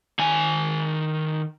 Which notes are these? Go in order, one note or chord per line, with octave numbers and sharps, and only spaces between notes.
D#3 G#5